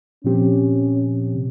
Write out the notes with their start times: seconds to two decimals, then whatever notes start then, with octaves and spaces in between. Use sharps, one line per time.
0.24 A#2 F3 C4 C#4 G4
1.35 C3